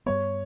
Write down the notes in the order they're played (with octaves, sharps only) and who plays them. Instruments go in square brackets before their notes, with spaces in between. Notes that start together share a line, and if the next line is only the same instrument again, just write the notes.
[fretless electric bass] G2 G3 B3 [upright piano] C#5